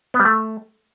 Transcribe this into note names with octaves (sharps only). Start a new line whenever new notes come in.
B3
G3
A3